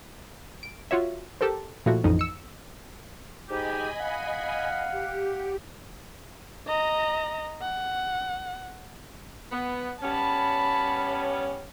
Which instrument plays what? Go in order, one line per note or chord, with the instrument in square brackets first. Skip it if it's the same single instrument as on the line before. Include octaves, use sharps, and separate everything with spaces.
[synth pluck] D7
F4 F#4 C#5 E5
G4 A4 A#4 C5
A#2 F3 A3 E4 F#4
A1 F2 D#4 D#5
E6 C#7
[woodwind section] G#2 G4 [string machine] D#5 G#5 B5
[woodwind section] F5 F#5
[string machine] G4
[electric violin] D#5 A#5
F#5
[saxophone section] B3
[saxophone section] G3 B3 C#4 [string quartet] A5 B5